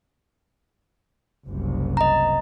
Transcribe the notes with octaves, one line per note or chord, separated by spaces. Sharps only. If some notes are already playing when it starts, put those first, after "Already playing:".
F#1 C2 C3
D#5 A#5